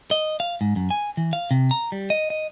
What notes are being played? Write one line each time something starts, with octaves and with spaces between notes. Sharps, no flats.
D#5
F5
G#2
F#2
G#5
E3
F5
C3
A#5
G3
D#5
D#5